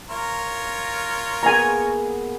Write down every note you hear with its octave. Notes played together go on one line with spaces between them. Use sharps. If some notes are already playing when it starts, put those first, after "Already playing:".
F4 A#4 C#5
A#3 B3 G#4 G#5 A#5